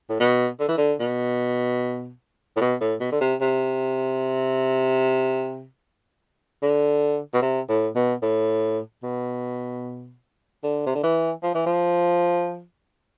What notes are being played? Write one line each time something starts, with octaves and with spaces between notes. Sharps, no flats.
A2
B2
D3
E3
D3
B2
A2
B2
A2
B2
D3
C3
C3
D3
B2
C3
A2
B2
A2
B2
D3
C3
D3
E3
F3
E3
F3